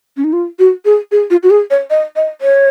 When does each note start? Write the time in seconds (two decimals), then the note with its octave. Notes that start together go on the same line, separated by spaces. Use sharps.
0.17 C#4
0.24 D#4
0.33 F4
0.59 F#4
0.85 G#4
1.12 G#4
1.30 F4
1.43 F#4
1.50 G#4
1.70 C#5
1.90 D#5
2.16 D#5
2.41 C#5